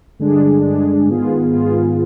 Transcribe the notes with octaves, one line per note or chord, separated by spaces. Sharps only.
G2 D3 G#3 D4 G#4
G2 D3 G#3 D4 G#4
G#2 D#3 B3 F4 G#4
G#2 D#3 B3 F4 G#4